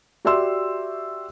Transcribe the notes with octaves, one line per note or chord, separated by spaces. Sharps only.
F#4 G4 D5 E5 C6 E6